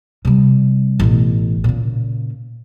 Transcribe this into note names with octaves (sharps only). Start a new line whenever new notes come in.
C3 G3
A1 B2
A#2 C#3